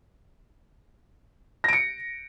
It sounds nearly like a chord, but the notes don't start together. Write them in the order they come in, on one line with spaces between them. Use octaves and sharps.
A#6 D7 C#7